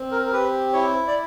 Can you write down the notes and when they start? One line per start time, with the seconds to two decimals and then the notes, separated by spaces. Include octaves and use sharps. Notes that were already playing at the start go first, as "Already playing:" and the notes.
Already playing: C4
0.12 A#4
0.26 A#4
0.32 G4 B4
0.73 E4 C#5
1.07 D5